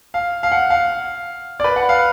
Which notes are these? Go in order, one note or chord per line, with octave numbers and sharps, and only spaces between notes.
F5
F5
F#5
F5
D5
B4
F#5
F5